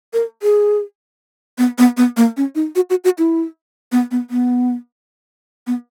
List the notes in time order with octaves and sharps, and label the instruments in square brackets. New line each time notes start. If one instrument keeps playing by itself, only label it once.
[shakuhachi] A#4
G#4
B3
B3
B3
A#3
C#4
D#4
F#4
F#4
F#4
E4
B3
B3
B3
B3